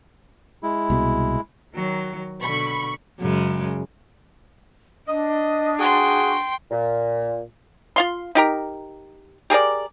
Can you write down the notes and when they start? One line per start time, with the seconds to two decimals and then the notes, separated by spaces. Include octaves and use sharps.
0.63 G#3 E4
0.90 C2 B2
1.74 D#3 F#3
2.41 B2 D3 B5 C#6
3.20 F#2 C#3 G#3
5.06 D4 D#5
5.79 F#4 G#4 G5 C6
6.71 A#2
7.96 F4 F5 C6
8.35 D#4 G4 A#4
9.50 G4 G#4 A#4 D5